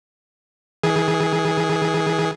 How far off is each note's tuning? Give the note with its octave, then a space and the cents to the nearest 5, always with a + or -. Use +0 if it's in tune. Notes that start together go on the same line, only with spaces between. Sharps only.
E3 -40 G#4 +0